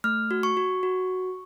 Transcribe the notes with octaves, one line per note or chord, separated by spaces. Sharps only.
A3 F6
F#4
C#6
F#4
F#4